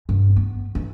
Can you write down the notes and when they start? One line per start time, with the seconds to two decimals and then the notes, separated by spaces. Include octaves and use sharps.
0.09 G2
0.36 B3
0.75 E3